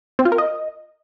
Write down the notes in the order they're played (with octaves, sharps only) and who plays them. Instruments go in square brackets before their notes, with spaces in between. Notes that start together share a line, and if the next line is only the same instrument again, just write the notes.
[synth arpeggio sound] C4
F4
A#4
D#5